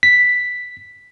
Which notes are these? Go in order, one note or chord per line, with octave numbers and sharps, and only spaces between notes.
B6